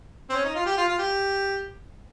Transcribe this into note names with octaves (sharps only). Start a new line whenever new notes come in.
C4
C#4
D#4
F4
G4
F4
F4
G4